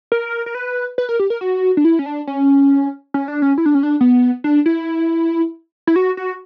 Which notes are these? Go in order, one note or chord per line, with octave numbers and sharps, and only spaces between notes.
A#4
A#4
B4
B4
A#4
G4
A#4
F#4
D4
E4
C#4
D4
C#4
C#4
D4
C#4
E4
D4
C#4
D4
B3
D4
E4
E4
F#4
F#4